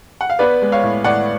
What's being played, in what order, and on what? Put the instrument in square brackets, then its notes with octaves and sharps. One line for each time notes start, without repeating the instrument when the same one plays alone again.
[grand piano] F#5
F5
B3 B4 D5
G#3
C#5 F5
A2
A2 D5 F#5